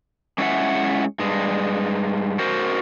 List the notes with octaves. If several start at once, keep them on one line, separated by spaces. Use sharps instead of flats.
G#3 C#4 E4 B4 E5 F#5
G2 G#3
F#4 A#4 C5